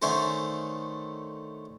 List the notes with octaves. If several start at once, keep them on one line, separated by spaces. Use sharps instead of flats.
D3 D#3 A3 C#4 C5